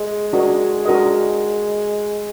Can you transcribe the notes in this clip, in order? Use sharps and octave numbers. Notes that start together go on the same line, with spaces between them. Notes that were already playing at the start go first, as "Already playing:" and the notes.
Already playing: G#3
D4 F#4 A#4 D#5
G#3 D4 F#4 A#4 D#5